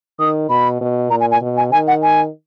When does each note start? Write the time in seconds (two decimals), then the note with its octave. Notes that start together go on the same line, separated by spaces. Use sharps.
0.19 D#3 D#6
0.49 B2 B5
0.81 B2
1.10 A#2 A#5
1.21 G#5
1.31 G#5
1.41 B2
1.57 G#5
1.72 D#3 G#5
1.88 F#5
2.03 G#5